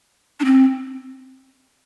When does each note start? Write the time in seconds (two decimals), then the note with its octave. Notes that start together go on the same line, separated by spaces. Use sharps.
0.40 D4
0.45 C4